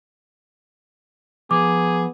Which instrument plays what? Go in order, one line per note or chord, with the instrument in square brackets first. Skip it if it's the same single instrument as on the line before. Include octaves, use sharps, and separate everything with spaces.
[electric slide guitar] F3 A#5 [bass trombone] B3 [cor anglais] G#4 [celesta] D6